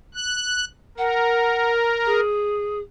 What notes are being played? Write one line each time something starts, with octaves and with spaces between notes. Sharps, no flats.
F#6
A#4 F#5
G#4